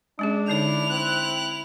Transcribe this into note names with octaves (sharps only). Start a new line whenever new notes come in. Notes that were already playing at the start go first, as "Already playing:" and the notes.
G#3 C#4 D4 G#4
D3 D#4 E4 C#5 F7
C4 F#6